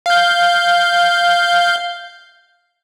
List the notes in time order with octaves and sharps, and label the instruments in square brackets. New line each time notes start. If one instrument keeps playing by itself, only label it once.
[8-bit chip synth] F5 G6